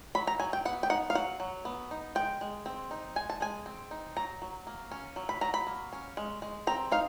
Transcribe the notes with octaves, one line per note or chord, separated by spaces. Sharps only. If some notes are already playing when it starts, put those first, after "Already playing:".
F#3 B5
A#5
F#3 G#5
G5
B3 F#5
G5
D#4 F#5
F5
F#3 F#5
F#3
B3
D#4
G#3 G5
G#3
C4
D#4
G#3 G#5
A5
G#3 G#5
C4
D#4
F#3 A#5
F#3
A#3
C#4
F#3
B5
F#3 A#5
B5
A#3
C#4
G#3
G#3
C4 A#5
D#4 F5